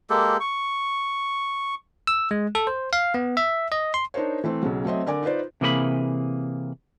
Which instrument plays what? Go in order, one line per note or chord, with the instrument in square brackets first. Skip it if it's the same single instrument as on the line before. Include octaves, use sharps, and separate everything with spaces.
[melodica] G#3 A#3 G4 A4
C#6
[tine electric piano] E6
G#3
A4
C5
F5
B3
E5
D#5
C6
[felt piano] D4 D#4 A#4 C5 C#5
E3 A3 C4
B1 C#3 F#3
F#3 A3 C4 D#5 E5
D3 A#4 D5 G#5 D6
D#4 F4 B4 C5 D5
[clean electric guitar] C3 E3 A#3 G#4 D5 B5